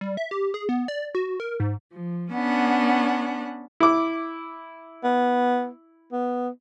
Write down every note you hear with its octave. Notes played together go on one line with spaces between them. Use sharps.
G3
E5
G4
G#4
B3
D5
F#4
A#4
G#2
F3
B3 C#4 D4 F#5
E4 D6
B3
B3